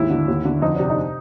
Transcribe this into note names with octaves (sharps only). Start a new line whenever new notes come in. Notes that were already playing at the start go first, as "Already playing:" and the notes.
Already playing: D#2 G#2 E4
D3
D#2
D3
F2 D#4
C3 D4
D#4